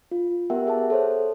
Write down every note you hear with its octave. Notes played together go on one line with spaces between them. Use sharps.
F4
B3 G4 A#4 E5 F#5 G5
G#4 E5 F#5 A5
A4 C5 C#5